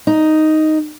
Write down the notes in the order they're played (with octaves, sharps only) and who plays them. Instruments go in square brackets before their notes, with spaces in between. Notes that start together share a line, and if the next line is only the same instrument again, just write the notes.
[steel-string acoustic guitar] D#4